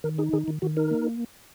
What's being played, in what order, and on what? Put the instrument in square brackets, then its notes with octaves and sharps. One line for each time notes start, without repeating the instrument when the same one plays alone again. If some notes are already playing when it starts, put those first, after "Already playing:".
[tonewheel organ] D#3 A#4
D#4 G#4
D#3 G#4
D#3
D#3 F#4
D#4 A#4
A#3